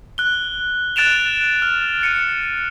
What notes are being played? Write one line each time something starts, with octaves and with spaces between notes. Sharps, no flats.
F#6 G7
F#6 A6 D7 E7 F7
F6
A6 C#7 D#7